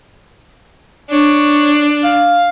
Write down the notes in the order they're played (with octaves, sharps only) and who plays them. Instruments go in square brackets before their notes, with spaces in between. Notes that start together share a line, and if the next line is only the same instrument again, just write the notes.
[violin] D4 [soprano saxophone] C#5
[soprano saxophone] F5